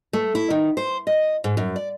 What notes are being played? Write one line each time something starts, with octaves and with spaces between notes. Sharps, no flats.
A3
E4
D#3
C5
D#5
G#2
F#2
D5